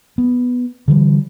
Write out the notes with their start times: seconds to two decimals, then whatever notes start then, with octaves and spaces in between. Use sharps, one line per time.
0.18 B3
0.88 D3 E3 G3